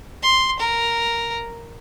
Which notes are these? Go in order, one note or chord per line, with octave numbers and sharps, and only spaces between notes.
C6
A#4